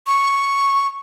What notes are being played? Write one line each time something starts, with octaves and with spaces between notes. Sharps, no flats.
C#6